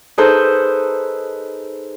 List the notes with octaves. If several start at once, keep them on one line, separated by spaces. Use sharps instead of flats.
D#4 G#4 A4 B4 C5